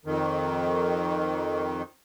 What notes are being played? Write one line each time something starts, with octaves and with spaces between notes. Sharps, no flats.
F2 D#3